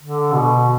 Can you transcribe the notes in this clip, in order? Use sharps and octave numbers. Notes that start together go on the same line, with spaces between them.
D3
B2